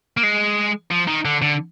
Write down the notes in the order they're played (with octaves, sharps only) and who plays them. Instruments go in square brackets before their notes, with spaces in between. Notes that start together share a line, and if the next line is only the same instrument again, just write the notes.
[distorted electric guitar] A#3
G#3
F3
D#3
D3
D3